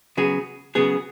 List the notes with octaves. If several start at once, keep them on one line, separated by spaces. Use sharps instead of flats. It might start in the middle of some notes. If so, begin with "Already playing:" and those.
C#3 F#3 B3 G#4
C#3 F#3 B3 G#4